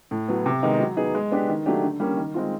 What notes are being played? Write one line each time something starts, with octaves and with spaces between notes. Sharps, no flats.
A2
F#3 B3
C3
D#3 G#3 B3 D#4
F#3
B3 D#4 G#4
G#3
B3 D4 G4 B4
D#3
F#3 A3 D4 G4
D3
G3 A#3 C#4
D#3
G#3 C4 F4